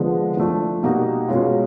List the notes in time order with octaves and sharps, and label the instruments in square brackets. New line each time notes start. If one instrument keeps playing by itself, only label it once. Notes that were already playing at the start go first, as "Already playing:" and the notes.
Already playing: [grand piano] D3 F3 G#3 B3
F3 A3 D4
B2 G3 A#3 D#4 F#4
B2 G#3 C#4 F4